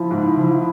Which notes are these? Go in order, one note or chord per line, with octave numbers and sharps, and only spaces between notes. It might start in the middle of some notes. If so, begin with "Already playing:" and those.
Already playing: F3 E4
G#2
F3